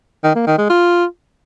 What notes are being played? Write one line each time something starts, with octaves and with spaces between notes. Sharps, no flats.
D#3
A#3
D#3
G#3
F4